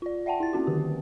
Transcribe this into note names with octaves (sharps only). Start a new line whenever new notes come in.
F4 D5
D5 E5 F#5 G5 A5
E4 A6
A#3 C4 C#4 F#4
D3 D#3 G4